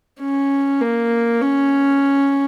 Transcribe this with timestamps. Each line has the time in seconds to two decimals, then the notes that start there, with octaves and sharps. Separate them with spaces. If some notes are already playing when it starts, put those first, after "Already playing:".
0.20 C#4
0.81 A#3
1.41 C#4